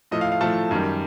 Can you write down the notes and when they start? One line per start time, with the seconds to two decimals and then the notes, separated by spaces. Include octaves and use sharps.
0.11 A2 F3 A3 D#5
0.21 F5
0.32 F5
0.41 A2 F3 A3 A5
0.71 F#2 D#3 G3